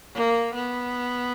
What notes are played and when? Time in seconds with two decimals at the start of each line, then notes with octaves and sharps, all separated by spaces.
0.14 A#3
0.55 B3